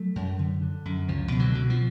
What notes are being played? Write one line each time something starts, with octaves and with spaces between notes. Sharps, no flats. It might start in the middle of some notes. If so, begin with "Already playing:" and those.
Already playing: F#3 A3
F#2
D3
D3
F#2
C#2 F3
B2
D3 F#3
B2
F3